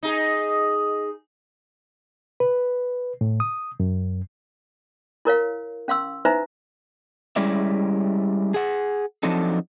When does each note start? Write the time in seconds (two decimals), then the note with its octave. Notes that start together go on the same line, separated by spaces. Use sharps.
0.03 D#4 G#4
2.40 B4
3.21 A2
3.40 D#6
3.80 F#2
5.25 E4 A#4 C#5 F5
5.88 C#4 F5 C6 E6
6.25 D#4 E4 B4 C5 E5 A#5
7.36 G3 G#3 C#4 E4 D5 E5
8.54 G#4 F#5
9.23 F3 F#3 C4 D4 D#4 A4